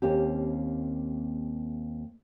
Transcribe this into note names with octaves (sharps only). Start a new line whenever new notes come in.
D#2 A#3 C4 C#4 D#4 G4